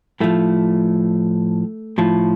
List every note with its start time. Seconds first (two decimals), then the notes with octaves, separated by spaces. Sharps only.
0.20 A2 F3 A3
1.98 A2 F3